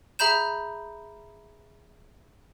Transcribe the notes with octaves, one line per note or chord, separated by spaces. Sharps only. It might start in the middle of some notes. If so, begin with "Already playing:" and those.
G#4 E5 A#5 B5 G6 E7